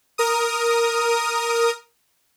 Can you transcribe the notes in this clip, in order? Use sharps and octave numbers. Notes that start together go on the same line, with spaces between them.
A#4 D#6